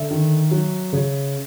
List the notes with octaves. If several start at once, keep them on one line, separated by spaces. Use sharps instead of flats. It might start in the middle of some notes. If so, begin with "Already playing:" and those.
Already playing: D3 E5
D#3
F#3
C#3